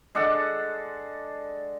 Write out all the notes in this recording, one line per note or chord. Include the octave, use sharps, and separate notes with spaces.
G#3 D4 A4 F#5